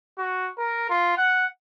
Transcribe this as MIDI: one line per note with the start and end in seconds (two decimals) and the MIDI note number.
0.18 0.50 66
0.58 0.86 70
0.89 1.14 65
1.17 1.45 78